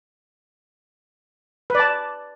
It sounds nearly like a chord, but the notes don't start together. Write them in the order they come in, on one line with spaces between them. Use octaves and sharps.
B4 D5 A5